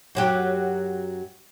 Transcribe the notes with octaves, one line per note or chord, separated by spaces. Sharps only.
F#2 F#3 G4